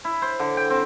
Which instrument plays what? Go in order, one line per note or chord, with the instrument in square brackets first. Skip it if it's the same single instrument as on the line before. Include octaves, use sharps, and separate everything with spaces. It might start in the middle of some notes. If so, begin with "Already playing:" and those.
[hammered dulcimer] E4
C5
D3
G5
C4